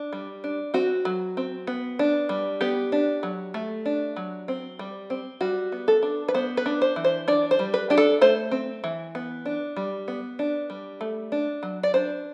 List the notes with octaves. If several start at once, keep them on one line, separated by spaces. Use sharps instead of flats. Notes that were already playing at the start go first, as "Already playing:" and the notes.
Already playing: D4
G3
D4
C4 F#4
F#3
C4
B3
D4
G3
B3 G4
D4
F#3
A3
D4
F#3
C4
G3
C4
G3 F#4
B3
A4
D4
B4
B3 C5
B4
D4
C5
E3
C5
D4 D5
C5
G3
B4
D4 G4
A4
A3 C5
C4
E3
B3
D4
G3
B3
D4
G3
A3
D4
F#3
D5
D4 C5